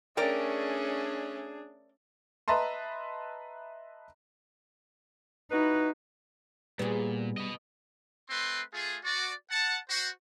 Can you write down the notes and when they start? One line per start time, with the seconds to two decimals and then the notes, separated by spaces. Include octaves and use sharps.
0.17 A3 C#4 D4 G#4 A#4 D5 G5
2.48 B4 D#5 E5 A5 A#5 C6
5.51 D#4 E4 F#4 B4
6.79 A#2 G3 B3 G#4
7.38 B4 D#5
8.29 A3 C4 B4 C6
8.74 A3 F4 G#4
9.04 F#4 D5
9.50 F#5 A5
9.89 F#4 C5